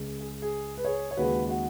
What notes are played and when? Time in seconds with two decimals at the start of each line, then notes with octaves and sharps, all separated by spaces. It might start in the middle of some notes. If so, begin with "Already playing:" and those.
Already playing: C#2 C#3 G#3
0.20 G#4
0.42 G#4
0.77 B4
0.85 G#4 C#5
1.11 C#5
1.17 D#2 C#3 G#3 F#4 B4
1.49 F#4